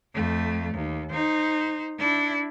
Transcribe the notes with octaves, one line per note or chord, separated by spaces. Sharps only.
F2 A3
D#2
D#4 C5
D4 E4